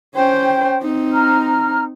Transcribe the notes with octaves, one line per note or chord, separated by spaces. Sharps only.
C#4 C5 G5
C4 D#4
A#5 F6